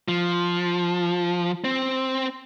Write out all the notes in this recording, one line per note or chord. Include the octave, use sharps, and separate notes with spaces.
F3
C4